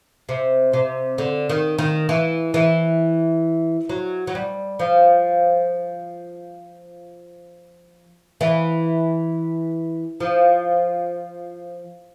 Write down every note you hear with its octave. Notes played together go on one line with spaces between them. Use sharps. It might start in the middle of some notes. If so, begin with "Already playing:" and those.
C3
C3
D3
D#3
D#3
E3
E3
F#3
F#3
G3
F3
E3
F3